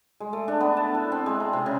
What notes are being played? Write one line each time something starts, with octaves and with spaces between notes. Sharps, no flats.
G#3
A3
D4
B3
A5
E4
C4
G#3
A#5
C3
C#3